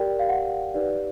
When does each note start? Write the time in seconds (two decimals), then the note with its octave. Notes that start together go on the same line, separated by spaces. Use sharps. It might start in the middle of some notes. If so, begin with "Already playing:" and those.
Already playing: G4 A#4 D5 G5
0.19 F5
0.29 F#5
0.74 D#4 G4 B4 D5